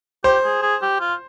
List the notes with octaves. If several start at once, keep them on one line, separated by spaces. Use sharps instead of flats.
G4 C5
G#4
G#4
G4
F4